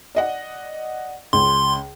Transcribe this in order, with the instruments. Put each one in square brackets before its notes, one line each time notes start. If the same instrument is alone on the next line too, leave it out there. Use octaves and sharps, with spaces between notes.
[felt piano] D5 D#5 F#5
[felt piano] C#2 C#3 [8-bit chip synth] C6